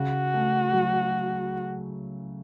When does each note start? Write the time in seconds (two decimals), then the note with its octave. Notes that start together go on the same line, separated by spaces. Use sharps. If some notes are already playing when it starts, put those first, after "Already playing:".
Already playing: C#3 F#4
0.34 A3
0.73 F#3